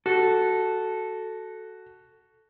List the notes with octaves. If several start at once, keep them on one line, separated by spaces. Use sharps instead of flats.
F#4 A4